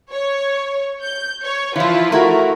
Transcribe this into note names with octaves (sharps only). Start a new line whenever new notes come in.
C#5
G6
C#5
E3 F3 E4 F4
A3 E4 F#4 A#4